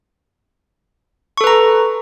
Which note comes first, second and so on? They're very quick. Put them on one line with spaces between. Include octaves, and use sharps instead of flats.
C#6 A4 B4 A#5